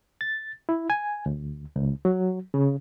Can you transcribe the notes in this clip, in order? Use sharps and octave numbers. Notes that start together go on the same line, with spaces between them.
A6
E4
G#5
D2
C#2
F#3
C#3